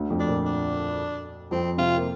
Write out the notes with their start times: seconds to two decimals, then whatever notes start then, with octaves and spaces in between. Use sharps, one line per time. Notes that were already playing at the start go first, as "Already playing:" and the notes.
Already playing: D2 D3
0.10 F2 F3
0.20 D4
0.28 A#2 A#3
0.46 D4
1.51 F2 F3 C4
1.78 C3 C4 F4
1.97 A#3